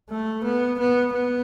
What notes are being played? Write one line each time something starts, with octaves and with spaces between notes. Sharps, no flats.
A3
B3
B3
B3